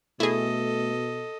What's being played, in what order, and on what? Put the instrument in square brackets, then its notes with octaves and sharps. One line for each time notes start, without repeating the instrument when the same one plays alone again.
[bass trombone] B2 [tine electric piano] A3 [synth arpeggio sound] E4 G#4 [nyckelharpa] A4 D#5